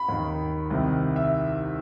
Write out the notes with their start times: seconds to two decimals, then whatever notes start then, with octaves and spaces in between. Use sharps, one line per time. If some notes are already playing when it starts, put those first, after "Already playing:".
Already playing: B5
0.09 D#2 D#3
0.70 C2 C3 D#3
1.16 E5